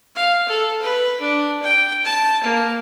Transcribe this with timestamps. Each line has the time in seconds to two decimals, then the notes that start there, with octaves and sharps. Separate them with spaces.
0.16 F5
0.48 A4
0.82 B4
1.20 D4
1.63 G5
2.05 A5
2.44 A#3